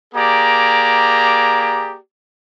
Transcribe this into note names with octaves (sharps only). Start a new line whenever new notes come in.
A#3 G4 G#4 D5 A#5